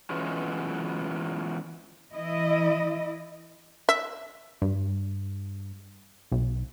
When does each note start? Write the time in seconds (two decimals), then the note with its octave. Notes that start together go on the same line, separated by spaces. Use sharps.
0.10 E3 F#3 G#3 B3 C#4 F4
2.12 E3 E4 D#5
3.89 E5
4.62 G2
6.32 B1